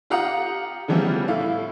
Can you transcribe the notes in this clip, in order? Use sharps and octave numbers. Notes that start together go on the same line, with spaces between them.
F4 G4 F5 F#5 A#5 D#6
C#3 E3 F3 G3 B3 C4
A2 E4 F5